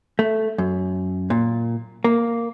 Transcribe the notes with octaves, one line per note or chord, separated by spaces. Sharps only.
A3
F#2
A#2
A#3